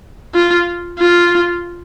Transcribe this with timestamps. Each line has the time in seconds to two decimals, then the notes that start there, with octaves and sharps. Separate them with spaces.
0.35 F4
0.99 F4